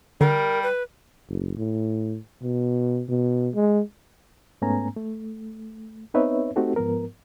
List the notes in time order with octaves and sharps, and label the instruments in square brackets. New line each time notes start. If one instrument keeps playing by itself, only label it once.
[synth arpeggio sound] D3 [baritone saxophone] G3 [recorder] A#4
[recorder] B4
[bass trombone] F#1
A2
B2
B2
G#3
[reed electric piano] G#2 A3 B3 C#4 G#5 A#5
A3
B3 C4 D#4 B4 C#5 E5
A3 C4 D#4 F#4 G4 A4
G#2 F3 B3 A#4